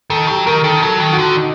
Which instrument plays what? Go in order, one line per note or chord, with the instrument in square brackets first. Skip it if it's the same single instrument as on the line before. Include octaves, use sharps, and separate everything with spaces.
[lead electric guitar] D#3 [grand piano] A4
[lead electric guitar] F#3 [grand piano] G4
[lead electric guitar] D#3 [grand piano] A#4
[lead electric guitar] D#3 [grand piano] A4
[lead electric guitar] F#3
[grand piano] A4
[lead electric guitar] D#3
[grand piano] F#4
[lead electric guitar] D3
[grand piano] D#4